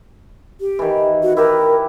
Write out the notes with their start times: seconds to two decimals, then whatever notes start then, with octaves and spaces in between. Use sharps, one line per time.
0.61 G4
0.79 D#3 E3
1.23 F#4
1.37 E4 G4 A#4 B4